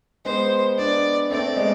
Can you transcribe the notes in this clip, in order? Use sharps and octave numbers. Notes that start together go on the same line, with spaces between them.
G#3 B3 C5
B3 D4 D5
A3 C4 D5
G#3 B3